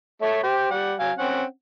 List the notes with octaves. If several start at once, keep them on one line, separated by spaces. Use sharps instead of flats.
A3 C#5 E5
G4 C5
G3 F#5
F#3 F5 G#5
C4 C#4 F#5